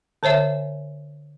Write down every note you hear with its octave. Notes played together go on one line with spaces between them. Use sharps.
D3 C5 C#5 E5 G#5